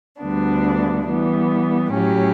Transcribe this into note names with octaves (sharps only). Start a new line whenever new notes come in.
D2 D3 G3 B3 D4
E3 G3 B3
A2 F#3 C#4 G4